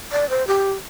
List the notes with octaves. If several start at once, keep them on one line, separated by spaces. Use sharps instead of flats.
D5
C5
G4